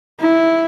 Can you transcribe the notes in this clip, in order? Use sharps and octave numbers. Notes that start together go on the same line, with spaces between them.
E4